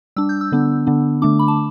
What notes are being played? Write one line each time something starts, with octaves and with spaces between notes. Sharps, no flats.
G3 D4 E6
G6
E6
D3 B3 D4
D3 B3 D4
D3 A3 D4 D6
B5
A5